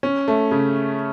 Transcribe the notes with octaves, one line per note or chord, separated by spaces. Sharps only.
C#4
A3
C#3